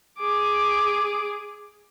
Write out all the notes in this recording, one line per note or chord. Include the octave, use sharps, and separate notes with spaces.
G#4 D6